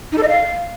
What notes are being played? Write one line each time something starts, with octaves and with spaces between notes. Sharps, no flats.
D#4
A4
D#5
F5